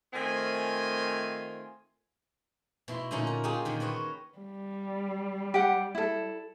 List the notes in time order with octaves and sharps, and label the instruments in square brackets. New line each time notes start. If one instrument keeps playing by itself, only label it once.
[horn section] D#3 A3 C4 F4 G#5
[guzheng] B2 E4 C6
A#2 D3 A3 C#4 D#4
A#4
G#3 D#4 F4 G4 G#4
A#2 D3 D#3
F#4 B4 C#5 D#5
[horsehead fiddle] G3
[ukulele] G4 F#5
E4 A4